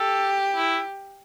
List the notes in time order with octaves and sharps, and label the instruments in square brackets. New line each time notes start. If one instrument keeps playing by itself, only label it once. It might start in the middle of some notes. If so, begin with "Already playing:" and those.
Already playing: [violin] G4 [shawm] A4
[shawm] E4